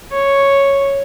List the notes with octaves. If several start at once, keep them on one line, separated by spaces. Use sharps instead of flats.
C#5